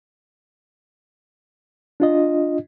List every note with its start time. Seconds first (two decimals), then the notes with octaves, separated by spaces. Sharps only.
2.00 D4 F4 D#5